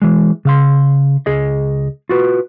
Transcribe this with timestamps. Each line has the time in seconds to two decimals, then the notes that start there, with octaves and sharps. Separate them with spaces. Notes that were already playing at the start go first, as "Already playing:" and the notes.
0.02 E3 G#3
0.45 C#3 F5 C6
1.26 C#2 G#4 D#5
2.09 F4 F#4 B4